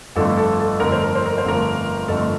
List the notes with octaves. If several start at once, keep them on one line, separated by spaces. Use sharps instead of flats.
G1 F2 D3 A3 A4
A4
A4
G1 F2 D3 A3 A#4
C5
A#4
C5
A#4
C5
G1 F2 D3 A3 A#4
G1 F2 D3 A3 A4